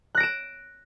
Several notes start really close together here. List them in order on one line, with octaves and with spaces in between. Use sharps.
F#6 A#6 D7 E7